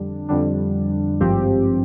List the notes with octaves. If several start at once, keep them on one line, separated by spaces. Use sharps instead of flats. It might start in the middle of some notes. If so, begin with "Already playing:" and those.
Already playing: F2 D3 G3 D4
F2 D3 G3 D4
G#1 G2 F3 C4 G4